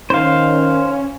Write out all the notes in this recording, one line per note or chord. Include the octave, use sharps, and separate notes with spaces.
D#3 C#4 C5 F5